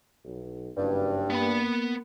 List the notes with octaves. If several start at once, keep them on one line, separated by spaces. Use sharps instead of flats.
B1
F#1 G2
A#3 B3 B5